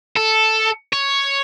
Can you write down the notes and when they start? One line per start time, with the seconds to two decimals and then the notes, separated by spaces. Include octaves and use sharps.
0.17 A4
0.93 C#5